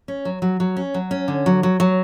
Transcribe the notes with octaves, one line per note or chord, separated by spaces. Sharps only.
C#4
F#3
F#3
F#3
C#4
F#3
C#4
D3
F#3
F#3
F#3